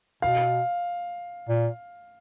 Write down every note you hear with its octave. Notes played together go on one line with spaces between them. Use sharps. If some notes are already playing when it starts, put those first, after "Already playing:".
B2 F5
A#2